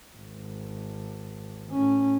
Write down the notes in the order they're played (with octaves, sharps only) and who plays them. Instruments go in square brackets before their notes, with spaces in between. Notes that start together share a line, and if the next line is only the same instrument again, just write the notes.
[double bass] G#1
A2 C#4